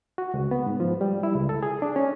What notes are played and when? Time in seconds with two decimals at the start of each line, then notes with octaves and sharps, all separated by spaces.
0.18 F#4
0.34 C#2
0.51 B3
0.66 G#2
0.80 F3
1.01 G3
1.23 E4
1.36 C#2
1.49 A4
1.63 G#4
1.82 D4
1.96 C#4